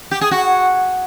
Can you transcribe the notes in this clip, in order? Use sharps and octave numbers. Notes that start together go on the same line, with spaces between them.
G4
G#4
F#4